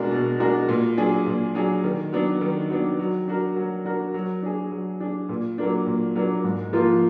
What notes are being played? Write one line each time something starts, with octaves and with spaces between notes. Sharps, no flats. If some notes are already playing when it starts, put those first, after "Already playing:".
Already playing: B2 G#3 D4 F#4 A#4
B2
G#3 D4 F#4 A#4
A#2
F#3 D4 G#4
A#2
F#3 D4 G#4
D#3
F#3 B3 D4
D#3
F#3 B3 D4
F#3
D4 F#4 A#4
F#3
D4 F#4 A#4
F#3
D4 G#4
F#3
D4 G#4
A#2
F#3 A#3 D4
A#2
F#3 A#3 D4
G#2
F3 A#3 F4